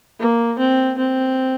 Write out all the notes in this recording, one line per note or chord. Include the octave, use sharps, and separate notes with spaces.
A#3
C4
C4